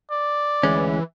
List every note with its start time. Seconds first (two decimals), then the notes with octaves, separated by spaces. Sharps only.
0.11 D5
0.63 D2 E3 G#3 C#4